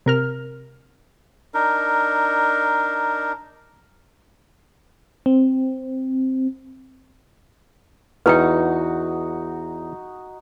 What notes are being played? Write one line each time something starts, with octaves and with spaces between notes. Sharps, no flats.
C3 A#4 F6
D4 D#4 A#4
C4
E2 D#4 F#4 B4 G5